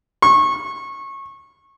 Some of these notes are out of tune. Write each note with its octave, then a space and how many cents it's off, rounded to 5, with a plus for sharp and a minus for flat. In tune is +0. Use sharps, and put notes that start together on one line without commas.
C#6 -25